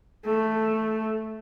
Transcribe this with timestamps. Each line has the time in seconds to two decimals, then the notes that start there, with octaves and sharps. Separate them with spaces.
0.25 A3